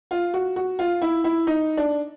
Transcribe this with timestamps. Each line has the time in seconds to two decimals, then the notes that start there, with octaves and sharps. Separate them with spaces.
0.11 F4
0.34 F#4
0.56 F#4
0.79 F4
1.02 E4
1.24 E4
1.47 D#4
1.77 D4